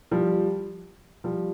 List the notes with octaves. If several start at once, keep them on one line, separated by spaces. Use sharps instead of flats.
F3 G3
F3 G3